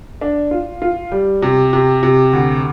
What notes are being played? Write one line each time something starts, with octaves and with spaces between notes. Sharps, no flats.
D4
F4
F4
G3
C3
C3
C3
D2